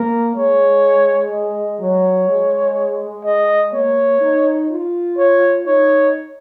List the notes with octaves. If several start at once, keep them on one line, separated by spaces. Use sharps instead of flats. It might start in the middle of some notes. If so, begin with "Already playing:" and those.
Already playing: A#3 A#4
G#3 C#5
D#5
F#3 C#5
G#3
D#5
A#3 C#5
D#4
F4
C#5
D#4 C#5